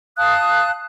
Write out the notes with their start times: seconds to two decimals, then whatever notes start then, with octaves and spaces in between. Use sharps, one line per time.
0.17 F5 A5 D#6 F#6